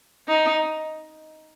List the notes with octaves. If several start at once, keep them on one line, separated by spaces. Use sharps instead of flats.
D#4